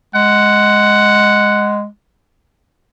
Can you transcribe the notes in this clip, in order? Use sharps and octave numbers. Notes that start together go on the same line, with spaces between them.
G#3 F#5